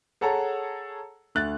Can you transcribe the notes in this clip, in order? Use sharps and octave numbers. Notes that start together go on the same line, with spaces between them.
G#4 A4 C#5 F#5 A5 A#5
D2 F#6 A6